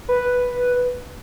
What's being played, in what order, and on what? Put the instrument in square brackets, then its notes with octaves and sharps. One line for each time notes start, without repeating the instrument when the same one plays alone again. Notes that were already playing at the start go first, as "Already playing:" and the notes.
[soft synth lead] B4